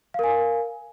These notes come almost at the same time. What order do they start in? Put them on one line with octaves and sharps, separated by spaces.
F5 A#4 G#5